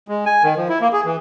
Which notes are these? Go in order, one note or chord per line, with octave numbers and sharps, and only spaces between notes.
G#3
G#5
D#3
F3
E4
A#3
G#4
E3